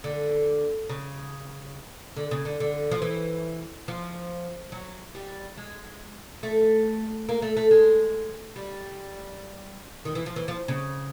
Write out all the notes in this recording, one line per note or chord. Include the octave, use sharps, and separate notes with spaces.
D3
C#3
D3
C#3
D3
D3
F3
E3
F3
F#3
G3
G#3
A3
A#3
A3
A3
G#3
G3
D#3
E3
F3
E3
F3
C#3